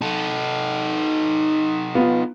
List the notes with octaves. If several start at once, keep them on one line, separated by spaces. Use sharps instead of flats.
D#4 A4
B3 F4